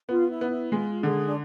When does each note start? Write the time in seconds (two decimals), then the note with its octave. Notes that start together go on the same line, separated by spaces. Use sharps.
0.09 B3 F4
0.31 E4
0.41 B3
0.51 E4
0.72 G#3 F4
1.03 D3 G#4
1.26 D4